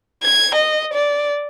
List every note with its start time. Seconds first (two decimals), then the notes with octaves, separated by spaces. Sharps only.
0.23 G#6
0.55 D#5
0.94 D5